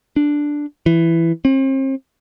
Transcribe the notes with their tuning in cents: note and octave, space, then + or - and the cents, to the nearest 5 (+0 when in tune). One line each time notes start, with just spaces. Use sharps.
D4 +0
E3 +10
C4 +40